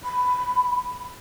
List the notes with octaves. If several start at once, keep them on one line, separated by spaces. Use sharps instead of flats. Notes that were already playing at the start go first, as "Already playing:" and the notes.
B5